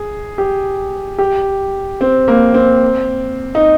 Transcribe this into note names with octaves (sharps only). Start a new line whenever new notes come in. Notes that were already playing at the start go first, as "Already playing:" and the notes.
Already playing: G#4
G4
G4
C4
A#3
C4
D#4